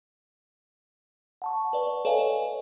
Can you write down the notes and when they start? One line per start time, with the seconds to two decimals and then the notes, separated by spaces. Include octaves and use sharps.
1.42 F#5 A5 C#6
1.73 B4 D5
2.05 A4 B4 C#5 D#5 F5 G#5